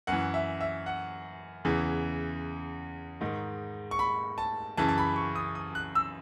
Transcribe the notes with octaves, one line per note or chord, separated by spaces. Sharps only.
F#2 E3 F#5
E5
E5
F#5
E2 C#3 E3
G#2 D#3
C#6
B5
A5
F#2 C#3 E3 A5
A5
B5
C#6
D#6
D#6
F#6
E6